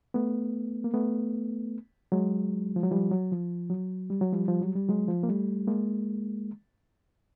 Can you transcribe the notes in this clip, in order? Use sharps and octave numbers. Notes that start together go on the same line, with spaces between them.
A3 B3
A#3
A3 B3
F#3 G#3
F3
F#3
F3 G3
F#3
F3
F#3
G3
F#3
F3 G3
F3
F#3
G3
F#3 G#3
F3
A#3
G3 A3
G#3 A#3